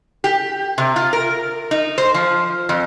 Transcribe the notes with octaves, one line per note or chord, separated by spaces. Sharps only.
G4
C3
F4
A#4
D#4
C5
F3
F2